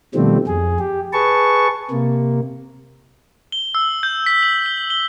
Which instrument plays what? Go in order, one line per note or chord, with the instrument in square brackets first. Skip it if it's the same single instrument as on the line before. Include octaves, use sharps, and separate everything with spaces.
[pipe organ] B2 D#3 F3 G3 A3 C4
F2 G#4
G4
G#4 B4 A5 C#6
C3 A#3
[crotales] G7
E6
G6
B6
F#7
G7
G7